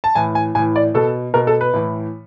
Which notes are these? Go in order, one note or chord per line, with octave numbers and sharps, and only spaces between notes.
A5
A2 E3 G#5
G#5
A2 E3 G#5
D5
B2 A4
B2 A#4
A4
B4
A2 E3